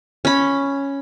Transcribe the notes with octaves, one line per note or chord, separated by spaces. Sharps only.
C#4 B5